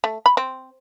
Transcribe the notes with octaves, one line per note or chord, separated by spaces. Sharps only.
A3
B5
C4